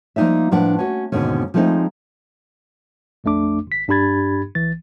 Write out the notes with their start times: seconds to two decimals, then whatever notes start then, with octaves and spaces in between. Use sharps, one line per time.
0.16 F3 A#3 C#4 D#4 D5 E5
0.52 A2 F3 D4 B4 F#5
0.79 C#4 F#4
1.12 D#2 G#2 B2 D3 C#4
1.54 F3 G#3 A3 C4 D#4
3.24 A#1 F2 A3 D4 D6
3.67 G#1 B6
3.88 G2 D4 G4 B5 G#6 A6
4.55 B1 E3 A6